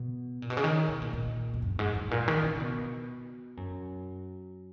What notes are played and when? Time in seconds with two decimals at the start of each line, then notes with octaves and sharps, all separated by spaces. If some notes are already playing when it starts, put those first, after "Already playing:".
Already playing: B2
0.42 A#2
0.50 B2
0.57 C#3
0.64 D#3
0.88 B2
1.02 A#2
1.13 A#2
1.54 F2
1.62 F#2
1.79 G#2
1.95 G#2
2.11 A#2
2.28 D#3
2.43 C#3
2.60 B2
3.57 F#2